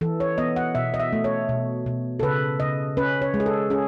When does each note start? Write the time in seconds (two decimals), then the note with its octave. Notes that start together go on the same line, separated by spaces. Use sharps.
0.01 E3 A4
0.20 C#5
0.38 B3 D#5
0.56 F#5
0.75 B2 E5
0.94 D#5
1.00 E5
1.13 A3
1.24 C#5
1.49 B2
1.86 B2
2.19 A4
2.23 C#3 B4
2.60 C#3 D#5
2.97 C#4 B4
3.22 C#5
3.34 G#3
3.40 G#4
3.46 A4
3.70 C#4 G#4